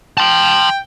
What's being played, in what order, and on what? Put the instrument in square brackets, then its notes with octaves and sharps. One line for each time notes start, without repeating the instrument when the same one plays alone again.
[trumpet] G5 [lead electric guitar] A5 C6